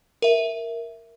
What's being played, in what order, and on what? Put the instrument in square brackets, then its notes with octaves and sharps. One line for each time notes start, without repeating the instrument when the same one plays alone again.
[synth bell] A#4 E5